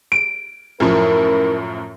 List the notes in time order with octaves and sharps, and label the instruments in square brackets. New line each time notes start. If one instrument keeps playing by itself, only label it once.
[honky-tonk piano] D7
[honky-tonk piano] F#2 A2 F3 [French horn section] E4 A#4